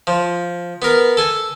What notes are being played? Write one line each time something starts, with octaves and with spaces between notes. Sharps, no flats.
F3
B3 A#4
A4 G#5